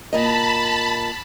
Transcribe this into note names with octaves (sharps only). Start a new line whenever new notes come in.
A#2 A#4 D#5 A5 B5